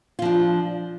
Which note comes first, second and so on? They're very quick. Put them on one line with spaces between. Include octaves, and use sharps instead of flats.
F4 F3 D4